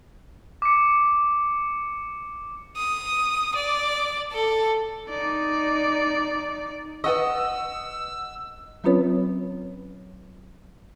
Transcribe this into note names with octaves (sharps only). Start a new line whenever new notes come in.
D6 C#7
D#6
D5
A4
D#4 D5
B4 D#5 F#5 C#6 D#6 E6
F#3 C4 C#4 F4 B4 C#5